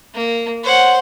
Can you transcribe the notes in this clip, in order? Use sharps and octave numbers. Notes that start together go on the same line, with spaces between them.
A#3
C5 C#5 F#5